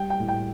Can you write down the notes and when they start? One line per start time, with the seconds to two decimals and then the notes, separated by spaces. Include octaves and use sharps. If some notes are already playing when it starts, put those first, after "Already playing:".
Already playing: G3 G5
0.10 G5
0.20 A2
0.28 G5